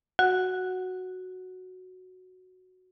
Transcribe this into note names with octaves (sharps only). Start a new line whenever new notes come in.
F#4 F#5